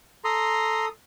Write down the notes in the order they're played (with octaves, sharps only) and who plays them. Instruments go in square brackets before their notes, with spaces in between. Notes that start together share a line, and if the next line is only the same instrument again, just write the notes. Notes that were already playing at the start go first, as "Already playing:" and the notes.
[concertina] A4 D#6 [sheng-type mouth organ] A#5 C6